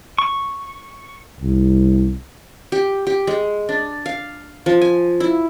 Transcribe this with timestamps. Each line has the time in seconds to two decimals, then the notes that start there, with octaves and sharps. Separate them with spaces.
0.18 C#6
1.40 C2
2.72 G4
3.07 G4
3.27 G#3
3.69 D4
4.06 F5
4.66 F3
4.82 G#5
5.20 E4